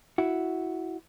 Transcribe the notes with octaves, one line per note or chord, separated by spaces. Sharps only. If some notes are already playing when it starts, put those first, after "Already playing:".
E4 F#4